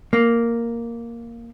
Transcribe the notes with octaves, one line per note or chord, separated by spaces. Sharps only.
A#3